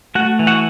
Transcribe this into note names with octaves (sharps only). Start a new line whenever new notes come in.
A3 F#4 F#5
E3
F#4 F#5